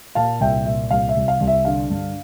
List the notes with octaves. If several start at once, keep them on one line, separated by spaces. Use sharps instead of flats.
A#2 F5 A5
C2 E5 G5
A#2 E5
C2 F5
E5
C2
F5
C2
E5
D3 F5
G2